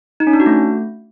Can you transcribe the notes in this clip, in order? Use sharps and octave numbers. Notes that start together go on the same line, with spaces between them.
D#4
C#4
D4
F#4
A3